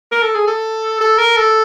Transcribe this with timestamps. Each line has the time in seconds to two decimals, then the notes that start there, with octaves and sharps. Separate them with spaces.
0.12 A#4
0.22 A4
0.35 G#4
0.47 A4
1.01 A4
1.18 A#4
1.37 A4